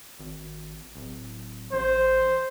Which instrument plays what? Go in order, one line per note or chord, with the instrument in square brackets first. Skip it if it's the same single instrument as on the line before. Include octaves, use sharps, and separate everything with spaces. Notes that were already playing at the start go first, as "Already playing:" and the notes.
[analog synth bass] G#1
D1
[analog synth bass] A1 [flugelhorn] C5